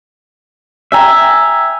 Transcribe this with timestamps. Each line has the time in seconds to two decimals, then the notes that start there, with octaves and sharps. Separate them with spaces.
0.92 E5 G5 G#5 A#5